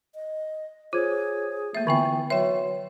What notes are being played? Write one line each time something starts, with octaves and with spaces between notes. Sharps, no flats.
D#5
F4 G#4 C5 C#5 G#6
A3 A#3 E5 A6
D3 E3 B3 F4 E5 G5 C#6
F#3 B4 C#5 E5 G5 C6